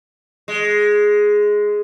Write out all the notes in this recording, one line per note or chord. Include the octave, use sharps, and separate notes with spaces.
G#3